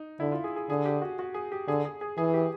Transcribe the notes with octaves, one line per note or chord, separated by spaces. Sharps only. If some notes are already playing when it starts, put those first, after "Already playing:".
Already playing: D#4
D3 E4
F4
G#4
G#4
D3 G#4
G4
F#4
F#4
G#4
G4
D3 G#4
G#4
G#4
E3 G#4
G4